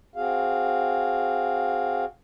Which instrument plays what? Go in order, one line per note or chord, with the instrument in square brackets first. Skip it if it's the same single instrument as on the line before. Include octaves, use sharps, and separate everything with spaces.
[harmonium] C4 F#4 G#4 F5